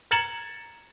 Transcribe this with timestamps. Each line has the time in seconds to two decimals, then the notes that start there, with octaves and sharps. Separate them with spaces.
0.11 A#5 G#6 A6 C#7 E7 F#7